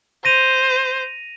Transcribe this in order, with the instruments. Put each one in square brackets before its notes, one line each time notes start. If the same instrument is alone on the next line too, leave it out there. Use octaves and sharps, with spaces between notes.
[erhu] C5 [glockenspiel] A#6 D#7 F7